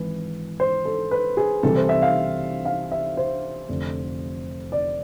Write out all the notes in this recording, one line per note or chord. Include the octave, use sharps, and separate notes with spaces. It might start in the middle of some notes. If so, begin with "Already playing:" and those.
Already playing: G#1 G#2 E3 B4
C5
A4
B4
G#4
C2 C3 E3 A4
C5
E5
F5
F5
E5
C5
F1 F2 D3
D5